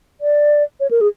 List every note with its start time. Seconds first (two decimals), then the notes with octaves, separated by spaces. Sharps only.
0.21 D5
0.80 C#5
0.91 A#4
1.01 G#4